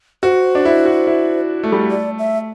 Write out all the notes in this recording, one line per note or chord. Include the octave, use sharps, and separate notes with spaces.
F#4 C5
D4
E4
F#4
E4
A3
G3
A3
D5
E5